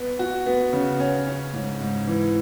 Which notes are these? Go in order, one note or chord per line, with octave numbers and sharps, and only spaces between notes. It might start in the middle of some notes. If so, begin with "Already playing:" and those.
Already playing: B3
F#4
B3
C#3
C#4
C#4
G#2
G#2
E3